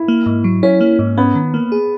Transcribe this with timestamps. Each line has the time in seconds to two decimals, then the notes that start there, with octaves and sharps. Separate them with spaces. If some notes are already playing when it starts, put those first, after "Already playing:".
Already playing: E4
0.08 A#3
0.26 G#2
0.44 F#3
0.63 C#4 E4
0.81 A#3
0.99 G#2
1.17 B3 C#4
1.35 D#3
1.54 A#3
1.72 G#4